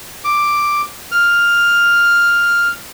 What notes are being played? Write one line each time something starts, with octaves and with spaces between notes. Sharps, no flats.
D6
F6